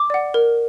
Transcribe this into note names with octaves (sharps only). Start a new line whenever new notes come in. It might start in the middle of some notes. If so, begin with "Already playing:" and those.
Already playing: D6
D5 F#5
A#4